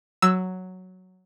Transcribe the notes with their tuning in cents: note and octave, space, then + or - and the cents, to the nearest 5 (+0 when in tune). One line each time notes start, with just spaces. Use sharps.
F#3 +0 E6 +0